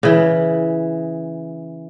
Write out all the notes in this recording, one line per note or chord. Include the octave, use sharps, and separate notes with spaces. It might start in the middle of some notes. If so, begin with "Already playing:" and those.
C#3 E3